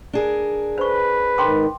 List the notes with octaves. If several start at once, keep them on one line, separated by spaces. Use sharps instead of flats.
D4 G#4 A#4
B4 C5 C#6
G#2 D#3 G5 C6 D6